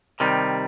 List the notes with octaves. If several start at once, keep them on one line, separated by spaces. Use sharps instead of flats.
C3 D#3 G3